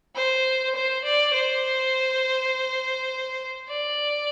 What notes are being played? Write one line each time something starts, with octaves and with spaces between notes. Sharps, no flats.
C5
C5
D5
C5
D5